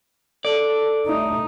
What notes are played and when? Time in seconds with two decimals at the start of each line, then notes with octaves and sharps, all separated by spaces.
0.45 A4 D5
1.07 A2 G3 A3 D#4